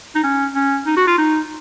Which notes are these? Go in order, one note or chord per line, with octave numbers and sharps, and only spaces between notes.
D#4
C#4
C#4
D#4
F#4
F4
D#4